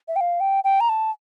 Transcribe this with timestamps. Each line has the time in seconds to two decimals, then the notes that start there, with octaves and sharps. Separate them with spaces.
0.08 E5
0.16 G5
0.21 F5
0.40 G5
0.64 G5
0.80 A#5
0.89 A5